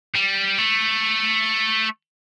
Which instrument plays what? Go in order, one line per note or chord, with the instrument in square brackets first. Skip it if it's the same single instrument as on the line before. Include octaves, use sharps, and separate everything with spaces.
[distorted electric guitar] G3
A3